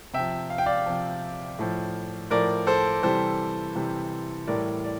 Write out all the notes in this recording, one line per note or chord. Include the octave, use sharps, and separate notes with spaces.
C3 F3 E5 G5
F5
G5
D5 F5
C3 F3
A2 F3
A2 F3 A#4 D5
A4 C5
C3 E3 G3 A4 C5
C3 E3 G3
A2 E3 G3 A#4 D5
D5